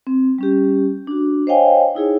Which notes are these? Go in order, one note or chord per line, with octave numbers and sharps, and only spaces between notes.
C4
G3 C#4 G4
D4 F#4
C5 C#5 D#5 F5 G5 G#5
D#4 E4 G#4 C#5